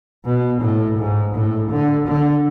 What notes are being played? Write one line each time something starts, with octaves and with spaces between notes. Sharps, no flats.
B2
A2
G#2
A2
D3
D3